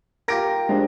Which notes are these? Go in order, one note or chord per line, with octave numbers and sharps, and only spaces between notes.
F4 G4 A#4 G5 A#6 D7
G#3 D4 C5